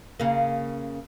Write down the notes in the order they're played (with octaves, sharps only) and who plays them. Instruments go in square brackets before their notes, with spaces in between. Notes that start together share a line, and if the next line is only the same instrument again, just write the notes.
[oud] C#3 A#3